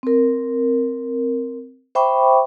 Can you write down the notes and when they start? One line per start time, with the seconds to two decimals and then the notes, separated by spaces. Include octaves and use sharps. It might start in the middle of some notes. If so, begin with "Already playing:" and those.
0.03 C4 A#4
1.95 C5 E5 G5 B5 C#6 D6